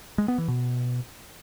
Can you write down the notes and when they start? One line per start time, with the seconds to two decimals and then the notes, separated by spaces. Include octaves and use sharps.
0.18 G#3
0.28 B3
0.38 E3
0.48 B2